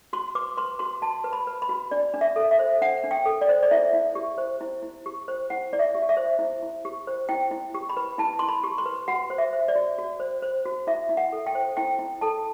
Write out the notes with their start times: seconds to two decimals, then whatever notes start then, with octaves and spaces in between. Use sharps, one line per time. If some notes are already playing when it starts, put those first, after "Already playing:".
0.13 F#4 C6
0.35 B4 D6
0.57 B4 C6
0.79 F#4 C6
1.02 F#4 A5
1.24 B4
1.33 B5
1.47 B4
1.62 B5
1.69 F#4
1.91 D4 D5
2.14 D4
2.21 E5
2.36 A4
2.51 E5
2.59 C5
2.81 D4 F#5
3.04 D4
3.11 G5
3.26 A4
3.41 D5
3.49 C5
3.63 D5
3.71 E4 E5
3.93 E4
4.15 G4
4.38 C5
4.61 E4
4.82 E4
5.06 G4
5.28 C5
5.50 E4 F#5
5.73 E4 D5
5.79 E5
5.95 G4
6.09 E5
6.17 C5
6.39 E4
6.62 E4
6.85 G4
7.07 C5
7.29 E4 G5
7.51 E4
7.75 G4
7.89 B5
7.97 B4
8.18 E4 A5
8.39 E4 C6
8.48 B5
8.64 G4
8.78 C6
8.86 B4
9.08 F#4 F#5
9.30 C5
9.38 E5
9.53 C5
9.68 D5
9.76 F#4
9.98 F#4
10.20 C5
10.42 C5
10.66 F#4
10.87 E4 E5
11.09 E4
11.17 F#5
11.32 A4
11.46 G5
11.55 C5
11.77 E4 G5
11.99 E4
12.21 A4 A5